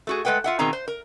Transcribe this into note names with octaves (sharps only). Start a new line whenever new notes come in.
A3 F#4 G#4
G#3 A3 B4 F#5 G5
F4 E5 F#5
B2 D#3 C4 G#4 A#5
C5
A#4